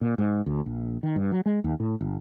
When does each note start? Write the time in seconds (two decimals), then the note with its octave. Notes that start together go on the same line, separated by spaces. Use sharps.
0.01 A#2
0.18 G#2
0.46 D2
0.66 A#1
1.03 D#3
1.16 G2
1.32 F#3
1.46 G#3
1.64 D#2
1.80 A2
2.01 G1